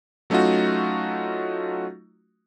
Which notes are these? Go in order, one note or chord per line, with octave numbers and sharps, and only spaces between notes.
F#3 A3 C#4 D#4 F4 F#4